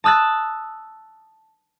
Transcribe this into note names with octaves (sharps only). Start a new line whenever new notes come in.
A5 D#6 E6 F#6 A6